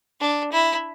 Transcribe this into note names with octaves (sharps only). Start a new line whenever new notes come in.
D4
E4